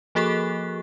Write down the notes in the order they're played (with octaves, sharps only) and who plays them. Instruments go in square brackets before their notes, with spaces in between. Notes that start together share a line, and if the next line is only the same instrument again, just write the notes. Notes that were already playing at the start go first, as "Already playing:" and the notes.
[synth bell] F3 A#3 F#4 G#4 A4 F#6